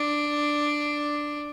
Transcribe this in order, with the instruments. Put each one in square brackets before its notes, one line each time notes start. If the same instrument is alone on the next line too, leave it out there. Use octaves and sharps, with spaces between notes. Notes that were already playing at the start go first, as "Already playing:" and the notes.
Already playing: [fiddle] D4